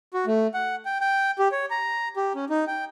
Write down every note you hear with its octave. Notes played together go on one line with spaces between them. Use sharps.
F#4
A3
F#5
G5
G5
G4
C#5
A#5
G4
C#4
D#4
G5